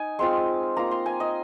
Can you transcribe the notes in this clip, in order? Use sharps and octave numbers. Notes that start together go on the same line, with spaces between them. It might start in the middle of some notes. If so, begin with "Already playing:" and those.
Already playing: D#4 G#5
G#3 C4 F4 C6
A#3 F4 A#5
C6
G#5
D#5